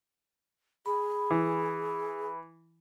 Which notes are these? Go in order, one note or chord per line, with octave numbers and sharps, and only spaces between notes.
G#4 B5
E3